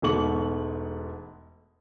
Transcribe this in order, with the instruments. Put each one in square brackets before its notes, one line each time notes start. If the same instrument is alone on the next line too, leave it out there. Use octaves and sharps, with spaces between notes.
[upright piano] E1 G#2 B2 A3 C#6 F#7